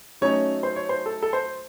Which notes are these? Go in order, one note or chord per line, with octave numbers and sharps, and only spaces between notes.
F#3 A3 C#4 D#4 C#5
C5
C#5
C5
A4
A4
C5